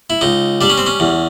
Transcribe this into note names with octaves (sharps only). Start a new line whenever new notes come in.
E4
C#2 D#4
G3 D4
C#4
C4
C#4
E2